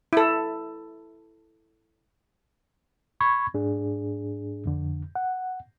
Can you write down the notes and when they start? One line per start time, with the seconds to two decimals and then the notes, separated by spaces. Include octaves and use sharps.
0.13 E4 A4
3.20 B5 C#6 G#6
3.54 G#2 D4 G#4
4.66 F2 D3
5.15 F#5